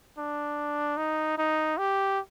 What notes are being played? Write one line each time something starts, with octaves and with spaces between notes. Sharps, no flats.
D4
D#4
D#4
G4